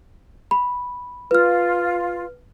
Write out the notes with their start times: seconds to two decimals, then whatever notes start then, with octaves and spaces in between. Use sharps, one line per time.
0.51 B5
1.31 F4 B4 F6